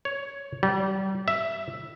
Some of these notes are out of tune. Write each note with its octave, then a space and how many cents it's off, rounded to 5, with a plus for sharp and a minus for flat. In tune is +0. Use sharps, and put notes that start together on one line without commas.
C#5 +10
G3 -30
E5 +5